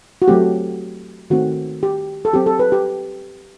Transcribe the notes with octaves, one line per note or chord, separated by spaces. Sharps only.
F#4
F#3 A3 C4 G4
D#3 A3 C4 F#4
G4
A4
F#3 C4 G4
A4
B4
G4